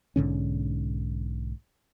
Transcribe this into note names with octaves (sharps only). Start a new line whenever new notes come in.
B1 G#2 D3 C#4